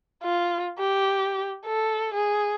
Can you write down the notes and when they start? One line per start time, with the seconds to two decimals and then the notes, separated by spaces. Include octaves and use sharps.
0.23 F4
0.79 G4
1.66 A4
2.14 G#4